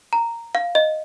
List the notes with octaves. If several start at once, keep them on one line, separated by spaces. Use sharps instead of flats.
A#5
F5
D#5